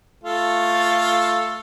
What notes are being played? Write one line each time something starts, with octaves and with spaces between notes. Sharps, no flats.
A3 F4 A4